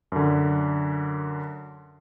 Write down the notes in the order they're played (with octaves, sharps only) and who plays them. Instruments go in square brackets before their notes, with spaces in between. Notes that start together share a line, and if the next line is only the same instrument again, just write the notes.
[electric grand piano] F#2 D3